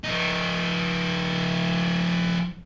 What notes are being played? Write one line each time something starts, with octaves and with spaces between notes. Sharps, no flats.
F3 D#4